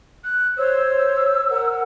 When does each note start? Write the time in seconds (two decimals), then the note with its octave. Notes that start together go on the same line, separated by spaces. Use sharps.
0.24 F#6
0.57 C5 C#5 E6
1.50 A#4 F#5